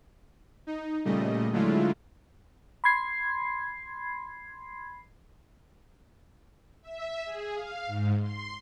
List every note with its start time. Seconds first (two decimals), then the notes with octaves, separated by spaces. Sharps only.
0.67 D#4
1.05 A#2 C#3 G3 A3 D#5
1.52 D3 F#3 G#3 A3 E4 F4
2.84 B5 C6 G#6 C7
6.82 E5
7.25 G#4
7.54 F5
7.86 G#2
8.21 C6